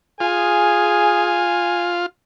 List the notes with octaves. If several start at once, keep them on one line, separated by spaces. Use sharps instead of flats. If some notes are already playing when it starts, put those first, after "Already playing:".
F4 G#4 G#5